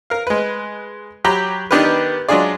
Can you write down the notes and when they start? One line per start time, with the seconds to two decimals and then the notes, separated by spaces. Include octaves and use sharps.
0.10 A#4 F5
0.27 G#3 B4
1.24 F#3 G4 A#5 B5
1.71 D#3 B3 D4 G4 A#4 B4
2.29 F#3 G#3 D4 F4 G#4 D5